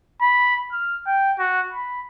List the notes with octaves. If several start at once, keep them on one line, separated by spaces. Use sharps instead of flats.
B5
F6
G5
F#4
B5